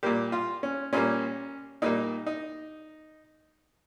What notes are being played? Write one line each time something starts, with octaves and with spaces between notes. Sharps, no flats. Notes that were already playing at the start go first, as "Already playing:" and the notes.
A#2 G3 A#3 G4
F4
C#4
A#2 G3 A#3 C#4
A#2 G3 A#3 D#4
D#4